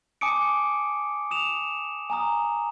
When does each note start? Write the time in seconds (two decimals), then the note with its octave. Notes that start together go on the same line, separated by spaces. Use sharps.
0.21 G#5 A5 D6 D#6 C#7 D7
1.31 D#6 E7 F7
2.10 G#5 A#5 D#6